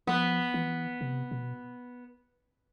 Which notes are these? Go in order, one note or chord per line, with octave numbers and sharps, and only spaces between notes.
F3 B3
E3
C3
B2